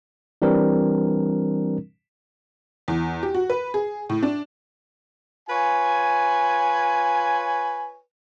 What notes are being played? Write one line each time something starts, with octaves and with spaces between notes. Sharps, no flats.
E3 G3 C4 D4 A#4
E2
G4
F#4
B4
G#4
A2
D4
F4 B4 C#5 G#5